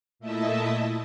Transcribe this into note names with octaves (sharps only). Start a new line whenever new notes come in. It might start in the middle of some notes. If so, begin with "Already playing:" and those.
A#2 A3 E4 D#5 E5 A5